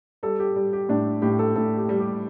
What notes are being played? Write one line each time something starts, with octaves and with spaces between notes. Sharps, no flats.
G3 A4
G4
G3
G4
A2 D4
A2 G4
A4
A2 A4
G4
G3
G4